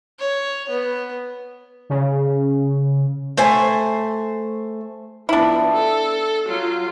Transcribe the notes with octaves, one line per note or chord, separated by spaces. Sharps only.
C#5
B3
C#3
A3 C5 G#5
F3 B3 D4 E4
A4
F#3 F4